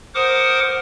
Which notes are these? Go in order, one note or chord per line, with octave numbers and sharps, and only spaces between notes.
A#4 C5 F#5 D6 D#6